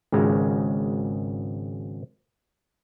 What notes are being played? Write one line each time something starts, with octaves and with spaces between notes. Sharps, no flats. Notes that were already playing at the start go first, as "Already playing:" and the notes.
G#1 C#3 G#3